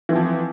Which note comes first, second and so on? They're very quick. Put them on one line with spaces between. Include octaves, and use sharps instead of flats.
E3 C4 F3